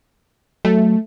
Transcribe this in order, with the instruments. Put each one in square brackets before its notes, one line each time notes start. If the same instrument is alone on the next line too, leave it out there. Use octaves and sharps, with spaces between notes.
[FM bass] F#3 [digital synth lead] A3